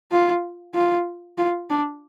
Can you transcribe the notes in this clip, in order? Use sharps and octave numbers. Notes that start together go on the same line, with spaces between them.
F4
F4
F4
D4